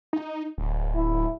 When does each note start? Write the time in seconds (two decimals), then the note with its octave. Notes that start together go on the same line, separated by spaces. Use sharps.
0.13 D#4
0.58 D1
0.95 E4